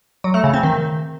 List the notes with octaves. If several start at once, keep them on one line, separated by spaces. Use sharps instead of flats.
F#3
A3
C#3
C4
D#3